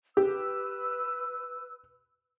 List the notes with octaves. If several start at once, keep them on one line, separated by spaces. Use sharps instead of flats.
G4 B4 E6